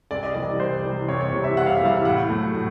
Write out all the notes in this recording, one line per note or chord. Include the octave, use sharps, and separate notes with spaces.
C2 D5
D#5
C3 E3 G3 D5
C2 C5
C3 E3 G3
C2 C#5
C#5
C3 E3 G3
E5
C2 F#5
F5
E5
C3 E3 G3 F5
A2 F#5
F#3 A3
A2